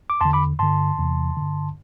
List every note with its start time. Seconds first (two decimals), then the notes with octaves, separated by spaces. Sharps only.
0.10 D6
0.21 E2 A5 C6
0.25 D3
0.33 B5 D6
0.59 G2 D3 A5 C6
0.98 E2 C3 E3
1.37 G2 D3